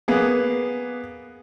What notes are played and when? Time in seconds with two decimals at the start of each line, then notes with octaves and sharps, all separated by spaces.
0.08 A#3 B3 G#4